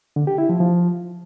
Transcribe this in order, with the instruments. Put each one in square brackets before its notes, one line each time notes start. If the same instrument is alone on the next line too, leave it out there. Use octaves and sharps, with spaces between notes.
[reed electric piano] D3
G4
E4
F3
F3